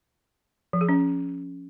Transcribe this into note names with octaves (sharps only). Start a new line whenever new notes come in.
F3
G#4
C#4